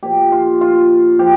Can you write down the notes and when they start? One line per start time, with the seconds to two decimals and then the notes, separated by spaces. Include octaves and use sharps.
0.03 A#2 F3 G4
0.32 F4
0.61 F4
1.19 F3 G4